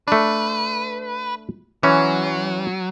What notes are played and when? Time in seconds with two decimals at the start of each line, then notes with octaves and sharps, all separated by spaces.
0.08 A3 D4 B4
1.83 E3 F#3 C#4